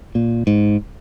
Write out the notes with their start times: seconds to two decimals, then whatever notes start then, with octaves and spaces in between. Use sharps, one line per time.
0.15 A#2
0.47 G#2